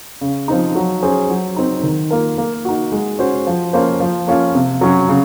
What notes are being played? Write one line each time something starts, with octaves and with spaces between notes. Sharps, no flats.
C#3
F3 C4 D#4
F#3
C#4 G#4 C5
F#3
C4 D#4
D#3
A#3 F4 A#4
A#3
D#4 F#4
G#3
C#4 F#4 C5
F3
A#3 C#4 F4 C5
F3
A#3 C#4 F4
C3
F#3 C#4 F#4
C#3